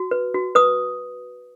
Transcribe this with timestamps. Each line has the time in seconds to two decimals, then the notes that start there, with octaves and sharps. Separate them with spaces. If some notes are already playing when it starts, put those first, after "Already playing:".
Already playing: F#4
0.11 B4
0.34 F#4
0.55 B4 D#6